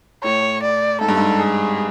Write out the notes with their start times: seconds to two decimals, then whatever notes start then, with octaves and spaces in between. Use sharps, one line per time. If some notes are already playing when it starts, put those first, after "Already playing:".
0.24 A2 C#5
0.62 D5
1.01 G#2 A4
1.09 G2
1.17 G#2
1.39 G#4